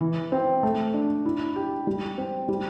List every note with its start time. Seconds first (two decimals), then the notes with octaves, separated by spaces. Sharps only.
0.01 E3
0.32 C4
0.63 A3
0.94 D4
1.25 E4
1.56 G4
1.87 G3
2.18 C4
2.48 G3